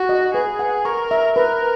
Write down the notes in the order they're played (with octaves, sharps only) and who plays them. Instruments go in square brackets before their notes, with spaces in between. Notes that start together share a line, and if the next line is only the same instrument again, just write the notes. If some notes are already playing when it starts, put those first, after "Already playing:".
Already playing: [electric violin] F#4
[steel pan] D#5
[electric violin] G#4 [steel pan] B4
[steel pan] F#5
[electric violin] A#4 [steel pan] C#6
[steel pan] E5
[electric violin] A#4 [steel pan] B4